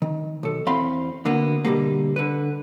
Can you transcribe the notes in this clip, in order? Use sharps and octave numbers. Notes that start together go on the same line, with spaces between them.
D#3
B1 A4
E2 C4 F5 B5 C6
D2 D3 A#3 B3
B2 D3 G3 A#3
D3 B4